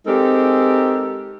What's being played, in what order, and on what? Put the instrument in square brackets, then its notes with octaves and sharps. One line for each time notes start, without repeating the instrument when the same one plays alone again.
[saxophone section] G#3 C4 D#4 G4 A4 A#4